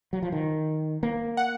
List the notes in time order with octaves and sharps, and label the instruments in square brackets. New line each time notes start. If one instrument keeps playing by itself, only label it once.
[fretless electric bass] F#3
F3
D#3
A#3
[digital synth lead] F#5